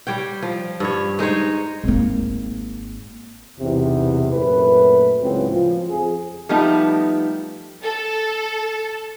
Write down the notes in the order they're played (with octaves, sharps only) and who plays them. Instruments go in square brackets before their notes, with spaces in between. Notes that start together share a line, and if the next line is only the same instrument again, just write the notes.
[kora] G3 C#5 G5
F3
G2 C#5
G#3 D#4 C5 C#5
[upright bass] G#1 A#3
[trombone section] B1 E2 C3
F#2 A#2 A3 B4
C#2 A2 C#3 F#3 B3 C4
F3
F2 G#4
[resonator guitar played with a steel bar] F3 G3 A3 B3 D#4 G4
[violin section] A4